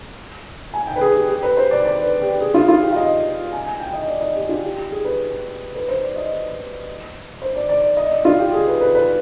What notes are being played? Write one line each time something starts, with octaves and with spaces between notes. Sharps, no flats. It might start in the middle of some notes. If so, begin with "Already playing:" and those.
G#5
G5
B4
G#4
G4
G4
B4
C5
D5
D5
B4
G4
G#4
F4
F4
G4
F5
D#5
G#5
G#5
G5
D#5
D5
D#5
G4
F4
G4
G4
G#4
B4
B4
C5
D5
D#5
C5
D5
D5
D5
D#5
D5
F4
G4
G#4
B4
B4
B4